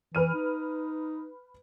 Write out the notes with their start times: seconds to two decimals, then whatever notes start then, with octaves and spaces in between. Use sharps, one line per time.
0.15 E3 B4 F6 D#7
0.34 D#4